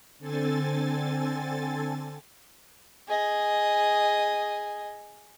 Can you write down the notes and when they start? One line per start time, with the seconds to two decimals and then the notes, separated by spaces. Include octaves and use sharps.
0.18 D3 C4 A4 G#5 A6
3.08 G#4 D#5